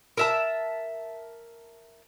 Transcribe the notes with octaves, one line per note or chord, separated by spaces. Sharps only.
A#4 E5 A5